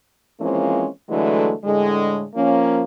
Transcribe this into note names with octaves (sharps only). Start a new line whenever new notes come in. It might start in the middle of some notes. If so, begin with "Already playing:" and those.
E3 F3 G#3 A#3 C4 C#4
D3 E3 F#3 G#3 A3
A2 D3 G#3
F3 A#3 C#4